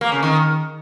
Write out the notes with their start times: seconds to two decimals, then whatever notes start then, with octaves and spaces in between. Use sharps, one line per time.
0.01 A#3
0.12 C#3
0.23 D#3